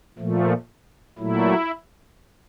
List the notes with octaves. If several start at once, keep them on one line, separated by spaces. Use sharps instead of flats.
A#2 F3 A3
A#2 F#3 A3 E4